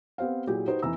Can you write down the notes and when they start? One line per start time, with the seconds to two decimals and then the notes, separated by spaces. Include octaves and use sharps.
0.18 B3 C4 G4 C5 F5
0.47 A#2 F#3 E4 G4 G#4
0.68 D#4 F#4 G4 B4 C5
0.82 F1 E3 A#5 E6